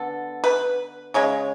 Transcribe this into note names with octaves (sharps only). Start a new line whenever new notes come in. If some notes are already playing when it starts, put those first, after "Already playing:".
Already playing: D3 B3 A4
B4
C#3 G#3 C#5